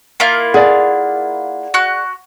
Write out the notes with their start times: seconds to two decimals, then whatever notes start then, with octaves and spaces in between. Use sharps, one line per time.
0.20 A#3 E4 F4
0.54 G#4 D5 F5 F#5
1.74 F#4 F#6